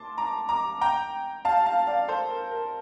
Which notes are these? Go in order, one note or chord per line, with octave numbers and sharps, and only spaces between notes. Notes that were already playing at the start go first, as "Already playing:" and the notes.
Already playing: A5 C6 D6
A#5 D6
A#5 D6
G5 A#5
F5 A5
F5 A5
D5 F5
A4 C5
A#4
A#4